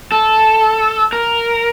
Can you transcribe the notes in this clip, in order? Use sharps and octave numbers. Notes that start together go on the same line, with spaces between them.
A4
A#4